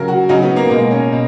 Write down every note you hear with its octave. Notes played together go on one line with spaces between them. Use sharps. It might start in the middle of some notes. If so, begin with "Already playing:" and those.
Already playing: C#3 F#3 A#4
F#4
C#3 F#3 D#4
B3
A#3
B2 G#3 A#3
C#4
B2